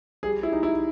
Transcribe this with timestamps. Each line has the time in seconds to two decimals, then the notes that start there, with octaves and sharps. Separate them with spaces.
0.23 G3 G#4
0.43 E4
0.53 D#4
0.63 E4